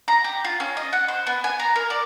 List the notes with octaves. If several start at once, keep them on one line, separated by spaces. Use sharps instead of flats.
A#5
G4
F4
C#4
D#5
F#5
C5
B3
G#5
A#5
A#4
D5